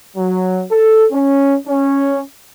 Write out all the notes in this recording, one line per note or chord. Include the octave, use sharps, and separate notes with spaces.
F#3
A4
C#4
C#4